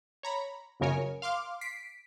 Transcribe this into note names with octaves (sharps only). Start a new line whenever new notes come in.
C#5 A#5 B5
G1 F#2 C#3 A#4 C#5 G#5
F5 C6 D6 F6
B6 C7 D7